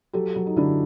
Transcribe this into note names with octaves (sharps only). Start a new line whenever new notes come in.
F#3 G4 A4
F#3
D#4
D3 D4 E4